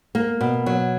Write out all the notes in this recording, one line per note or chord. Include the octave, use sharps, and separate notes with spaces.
A#3
B2
F#3